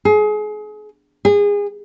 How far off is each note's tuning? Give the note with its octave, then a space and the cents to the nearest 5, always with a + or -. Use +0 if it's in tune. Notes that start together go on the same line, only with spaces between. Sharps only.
G#4 +30
G#4 -25